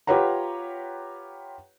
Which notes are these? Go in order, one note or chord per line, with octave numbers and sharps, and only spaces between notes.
F4 G4 B4 C#5 F#5 A#5